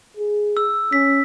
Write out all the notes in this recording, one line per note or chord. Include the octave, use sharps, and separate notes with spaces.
G#4
E6
C#4 B6